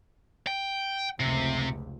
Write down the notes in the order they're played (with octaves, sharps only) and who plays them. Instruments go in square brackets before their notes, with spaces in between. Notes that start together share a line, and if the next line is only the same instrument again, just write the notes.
[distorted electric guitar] G5
[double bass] F1 C#2 [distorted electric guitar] C3